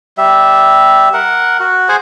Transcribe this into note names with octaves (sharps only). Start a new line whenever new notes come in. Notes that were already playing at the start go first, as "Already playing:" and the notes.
G3 E5
A#4 F#5
F#4
G#4 C5 F#5 G#5